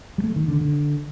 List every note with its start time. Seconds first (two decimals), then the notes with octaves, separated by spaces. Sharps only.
0.18 G3
0.24 A3
0.36 D#3
0.48 D3
0.61 D3